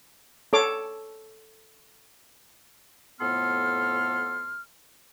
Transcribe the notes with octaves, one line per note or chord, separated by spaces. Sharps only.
A4 C#5 D6
F2 A2 B3 A4 C6 F6